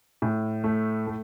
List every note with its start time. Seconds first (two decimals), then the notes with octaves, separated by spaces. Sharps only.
0.22 A2
0.64 A3
1.07 A3